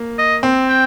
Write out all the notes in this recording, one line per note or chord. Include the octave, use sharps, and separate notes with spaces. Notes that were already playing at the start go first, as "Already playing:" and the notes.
Already playing: A#3
D#5
C4
G5